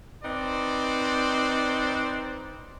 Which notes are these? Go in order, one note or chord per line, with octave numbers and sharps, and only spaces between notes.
C4 D#4 B4 C5 D5